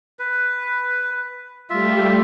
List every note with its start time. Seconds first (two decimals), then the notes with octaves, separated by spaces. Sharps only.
0.19 B4
1.70 G3 A3 F4 G4 E5